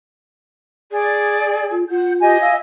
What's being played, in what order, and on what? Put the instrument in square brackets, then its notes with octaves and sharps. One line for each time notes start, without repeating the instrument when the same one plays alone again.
[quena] G#4 [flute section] D5
[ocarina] F4
[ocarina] F4 [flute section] F#5 G6
[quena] G4 [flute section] D#5 G#5
[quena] E5 [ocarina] F5